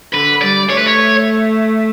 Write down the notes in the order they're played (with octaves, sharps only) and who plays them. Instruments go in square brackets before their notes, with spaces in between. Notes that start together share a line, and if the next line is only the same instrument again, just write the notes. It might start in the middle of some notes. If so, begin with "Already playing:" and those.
[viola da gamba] D3 [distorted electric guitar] B4
[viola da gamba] G3 [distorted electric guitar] D5
[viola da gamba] A3 [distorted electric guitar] C#5
[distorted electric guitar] B4
C#5